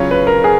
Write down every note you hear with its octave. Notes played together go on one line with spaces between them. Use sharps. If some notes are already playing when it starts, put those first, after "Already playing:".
Already playing: C#3 F#3 C#4 F4 C#5
B4
A#4
G#4